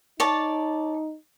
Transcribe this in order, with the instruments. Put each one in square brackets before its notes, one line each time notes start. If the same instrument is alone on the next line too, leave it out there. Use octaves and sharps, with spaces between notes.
[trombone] D#4 [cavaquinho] C#5 D5 A5